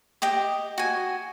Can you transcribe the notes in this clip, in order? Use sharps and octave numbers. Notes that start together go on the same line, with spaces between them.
G4 D#5 G5
F#4 G#5